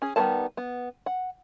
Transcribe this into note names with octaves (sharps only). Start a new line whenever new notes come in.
C#4 G#4
D#3 G3 B3 A4 A5
B3
F#5